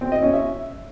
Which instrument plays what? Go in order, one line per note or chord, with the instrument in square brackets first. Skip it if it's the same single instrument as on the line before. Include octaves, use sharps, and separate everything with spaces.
[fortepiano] C4
D#5
C#4
E5